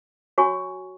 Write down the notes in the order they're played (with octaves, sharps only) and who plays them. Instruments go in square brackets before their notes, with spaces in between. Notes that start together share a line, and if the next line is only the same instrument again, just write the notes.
[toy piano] F#4 C#5 G#5 C#6